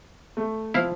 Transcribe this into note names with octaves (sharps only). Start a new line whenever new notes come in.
A3
F3 E4 F5